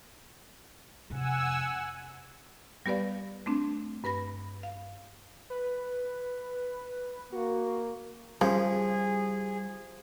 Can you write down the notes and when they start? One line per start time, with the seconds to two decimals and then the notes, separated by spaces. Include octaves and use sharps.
1.10 F2 C3 F#5 G#5 E6
2.86 G3 B3 G4 B4 D5 F5
3.46 A3 C4 D4
4.04 G2 B4 B5 A#6
4.63 F5
5.50 B4
7.32 A#3 F#4
8.41 C#3 F3 G3 G#4